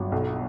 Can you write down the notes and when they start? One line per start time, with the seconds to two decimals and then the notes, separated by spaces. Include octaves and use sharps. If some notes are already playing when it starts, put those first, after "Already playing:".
Already playing: G1 F#3
0.12 B1